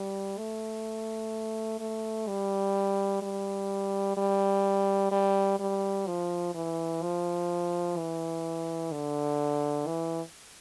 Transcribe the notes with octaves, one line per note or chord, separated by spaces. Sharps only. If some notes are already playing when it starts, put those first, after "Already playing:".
Already playing: G3
A3
A3
G3
G3
G3
G3
G3
F3
E3
F3
E3
D3
E3